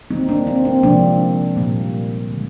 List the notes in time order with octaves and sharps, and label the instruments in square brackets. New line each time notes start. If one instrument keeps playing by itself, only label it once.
[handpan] D#3 G3 A#3 C4 D#4
A#3 D4
C4
C4
C3 F3 G#3 A#3 D4
A#2 G3 A#3
D3 G#3